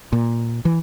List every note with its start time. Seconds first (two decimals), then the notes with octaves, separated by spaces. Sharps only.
0.12 A#2
0.65 E3